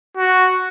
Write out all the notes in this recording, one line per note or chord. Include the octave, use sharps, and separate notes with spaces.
F#4